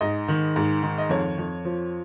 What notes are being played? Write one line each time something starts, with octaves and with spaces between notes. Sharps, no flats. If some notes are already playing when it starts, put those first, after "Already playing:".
G#2 D#5
D#3
G#2
D#3
D#5
F2 C#5
F2
F3